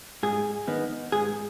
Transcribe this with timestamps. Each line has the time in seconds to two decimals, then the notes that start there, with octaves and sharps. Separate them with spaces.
0.23 G#2 G#4
0.67 D#3 B3 D#4
1.12 G#2 G#4